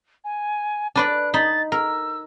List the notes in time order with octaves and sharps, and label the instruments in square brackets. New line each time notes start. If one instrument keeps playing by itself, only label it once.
[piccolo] G#5
[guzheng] D4 B4 D5 [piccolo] F#6
[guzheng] D#4 B5 [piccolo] A6
[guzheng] A#4 [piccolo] E6